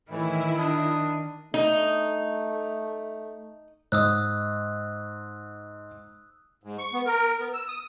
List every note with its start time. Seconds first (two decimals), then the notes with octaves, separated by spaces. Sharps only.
0.11 A2 D#3 E3 E4
0.58 D4 D#6
1.54 A3 D#4
3.92 G#2 D#6 E6 F#6
6.64 G#2
6.78 C#6
6.93 B3
7.06 A#4
7.39 B3
7.53 E6
7.68 D#6